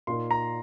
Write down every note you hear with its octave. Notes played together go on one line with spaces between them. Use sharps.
A#2 A#3 D#4 C6
A#5